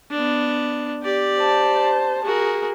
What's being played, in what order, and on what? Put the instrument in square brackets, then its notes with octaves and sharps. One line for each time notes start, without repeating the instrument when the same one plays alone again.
[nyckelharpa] B3 D4
G4 D5
[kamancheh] C5 A5
[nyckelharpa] F#4 A#4 [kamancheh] G#4